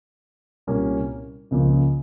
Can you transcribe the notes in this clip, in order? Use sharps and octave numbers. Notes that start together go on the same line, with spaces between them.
C2 A#2 G3 A#3 C#4
C#2 C#3 F3 A#3